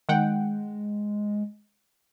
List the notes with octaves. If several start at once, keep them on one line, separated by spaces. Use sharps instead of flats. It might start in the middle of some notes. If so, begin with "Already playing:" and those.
D#3 G#3 F#5 G5